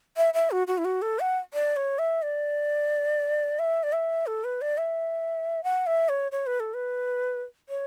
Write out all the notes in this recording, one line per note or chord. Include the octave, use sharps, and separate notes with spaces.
E5
E5
F#4
F#4
E4
F#4
A4
F#5
D5
C#5
E5
D5
E5
D5
E5
A4
B4
D5
E5
F#5
E5
C#5
C#5
B4
A4
B4
C#5